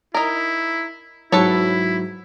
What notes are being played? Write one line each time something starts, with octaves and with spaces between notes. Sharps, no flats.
D#4 E4 A#4
G#2 F#3 E4 F#4 A4 B4 C#5